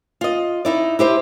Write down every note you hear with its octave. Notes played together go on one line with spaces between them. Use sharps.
F4 D#5
D#4 E4 D5
E4 G4 C5 D#5